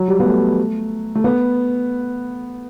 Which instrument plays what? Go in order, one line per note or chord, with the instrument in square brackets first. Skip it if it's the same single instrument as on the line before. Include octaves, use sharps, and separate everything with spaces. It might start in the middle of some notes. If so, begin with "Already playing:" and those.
Already playing: [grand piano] F#3
G3
B3
A3
A3
B3